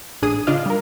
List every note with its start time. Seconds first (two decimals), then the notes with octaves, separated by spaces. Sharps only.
0.22 A1 D4 G#4 D#6
0.47 C#3 D4 F4 D#5 F5
0.66 G3 A#4